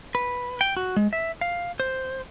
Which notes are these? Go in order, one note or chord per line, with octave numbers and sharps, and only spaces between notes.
B4
G5
F#4
G#3
E5
F5
C5